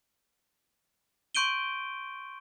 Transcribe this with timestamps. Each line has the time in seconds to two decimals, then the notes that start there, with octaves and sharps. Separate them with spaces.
1.35 C6 C#6 G6 D7 D#7 G7